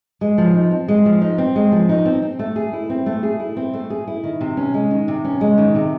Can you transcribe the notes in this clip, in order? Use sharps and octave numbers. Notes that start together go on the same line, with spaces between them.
G#3
F3
D#4
C4
G#3
F3
D#4
C4
G#3
F3
D#4
C4
C4
A3
G#4
E4
C4
A3
G#4
E4
C4
A3
G#4
E4
D#3
C3
C#4
G#3
D#3
C3
C#4
G#3
D#3
C3